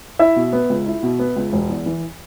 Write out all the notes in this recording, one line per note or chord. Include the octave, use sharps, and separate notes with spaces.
E4 E5
B2
B3
C#2
E4
B2
B3
C#2
E1
E2
E3